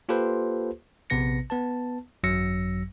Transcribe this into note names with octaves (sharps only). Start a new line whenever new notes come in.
A#3 F4 G4 A4 B4 C5
A#1 C3 B3 B4 A#6 C#7
B3 B4 A5
G#1 F#2 F#3 E6 A#6 C#7